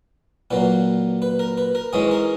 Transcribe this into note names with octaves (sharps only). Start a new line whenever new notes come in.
A#2 F#3 A#3 B4
B4
A#4
B4
A#4
G#2 E3 G#3 C#4 G#4
A#4